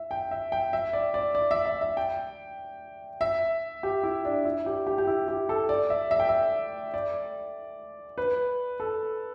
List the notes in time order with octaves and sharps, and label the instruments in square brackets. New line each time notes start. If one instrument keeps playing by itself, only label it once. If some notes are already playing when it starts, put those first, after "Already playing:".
Already playing: [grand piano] E5
G5
E5
G5
E5
D5
D5
D5
E5
E5
E5
G5
E5
G4
E4
D4
E4
G4
G4
G4
E4
G4
A4
D5
E5
E5
G5
E5
D5
B4
A4